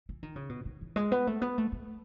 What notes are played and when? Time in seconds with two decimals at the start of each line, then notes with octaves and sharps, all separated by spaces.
0.09 E3
0.23 D#3
0.36 C#3
0.49 B2
0.66 D#3
0.81 E3
0.96 G#3
1.12 B3
1.27 A3
1.42 B3
1.58 A3
1.72 A3